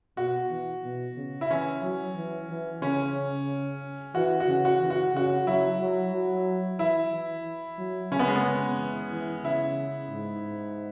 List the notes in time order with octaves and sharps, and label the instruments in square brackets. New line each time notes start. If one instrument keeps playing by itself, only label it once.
[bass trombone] B2 [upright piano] F#4
[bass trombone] E3
B2
C#3
[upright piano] E4
[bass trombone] E3 [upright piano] C#4
[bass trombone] F#3
E3
E3
[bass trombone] C#3 [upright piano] C#4
[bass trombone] E3 [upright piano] F#4
[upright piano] F#4
[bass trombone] C#3
[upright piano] F#4
[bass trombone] E3
[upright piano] F#4
[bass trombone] C#3 [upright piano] F#4
[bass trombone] F#3 [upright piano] E4
[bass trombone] F#3
F#3
[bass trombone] E3 [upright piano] E4
[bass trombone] E3
F#3
[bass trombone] C#3 [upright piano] C#4
[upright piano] B3
G#3
B3
[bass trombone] E3
E3
[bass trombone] C#3 [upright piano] E4
[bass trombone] G#2